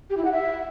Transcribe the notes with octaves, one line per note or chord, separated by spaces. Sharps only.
G4
E4
F#5
E5